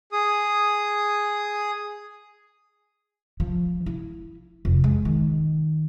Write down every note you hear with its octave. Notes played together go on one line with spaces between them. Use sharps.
G#4 D#6
F3
E4
F1
G#3
D#3